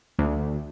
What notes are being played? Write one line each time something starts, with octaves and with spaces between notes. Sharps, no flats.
D2